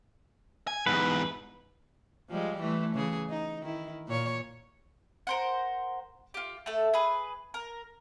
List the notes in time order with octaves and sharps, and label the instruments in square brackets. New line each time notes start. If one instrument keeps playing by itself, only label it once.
[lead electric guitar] G#5
[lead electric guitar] E2 G#2 [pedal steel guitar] B4
[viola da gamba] F3 G3 G#3
E3 A3
C#3 E3 G#4
D#4
D#3 E4
A#2 C#5
[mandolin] A#4 C5 F#5
F4 G4
A3 A4
G#4 B4
A#4